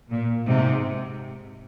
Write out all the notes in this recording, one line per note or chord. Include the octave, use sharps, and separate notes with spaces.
A#2
G#2 C3